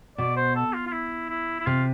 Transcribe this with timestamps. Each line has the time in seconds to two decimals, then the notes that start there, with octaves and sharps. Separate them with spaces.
0.18 B2 D5
0.36 C5
0.56 A4
0.73 F4
0.86 F4
0.92 E4
1.29 E4
1.60 E4
1.66 C3 F4